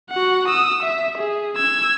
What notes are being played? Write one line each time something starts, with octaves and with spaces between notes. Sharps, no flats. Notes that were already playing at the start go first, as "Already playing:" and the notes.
F#4 F#5
D#6 E6
E5
G#4
E6 G#6